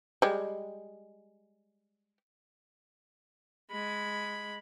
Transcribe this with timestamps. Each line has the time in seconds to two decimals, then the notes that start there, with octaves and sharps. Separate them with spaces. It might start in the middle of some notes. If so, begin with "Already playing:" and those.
0.22 G3 G#3
3.71 G#3 B5